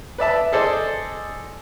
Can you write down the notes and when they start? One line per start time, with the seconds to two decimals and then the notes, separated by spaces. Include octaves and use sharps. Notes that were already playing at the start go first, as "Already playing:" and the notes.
0.18 B4 D5 E5 A5
0.53 G#4 A4 C5 D5 D#5